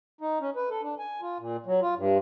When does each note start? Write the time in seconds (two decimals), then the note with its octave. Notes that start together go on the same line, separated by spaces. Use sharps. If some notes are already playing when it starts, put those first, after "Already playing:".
0.21 D#4
0.41 C#4
0.56 B4
0.70 A4
0.82 D4
0.99 G#5
1.22 F4
1.39 A#2
1.66 F#3
1.81 F4
1.96 G2